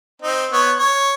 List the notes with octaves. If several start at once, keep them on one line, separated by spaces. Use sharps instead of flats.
C4 D#4
B3 C#5
C#5